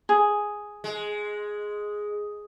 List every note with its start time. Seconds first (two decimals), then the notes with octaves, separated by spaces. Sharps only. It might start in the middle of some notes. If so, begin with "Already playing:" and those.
0.09 G#4
0.84 G#3